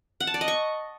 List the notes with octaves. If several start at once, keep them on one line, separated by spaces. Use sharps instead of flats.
F#5
A5
D5
D#5
C#6